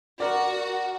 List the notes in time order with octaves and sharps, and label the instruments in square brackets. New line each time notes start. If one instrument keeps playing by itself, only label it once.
[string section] F#4 [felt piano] A#4 D5